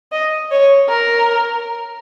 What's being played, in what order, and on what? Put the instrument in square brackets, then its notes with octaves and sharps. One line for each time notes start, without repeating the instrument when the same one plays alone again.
[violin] D#5
C#5
A#4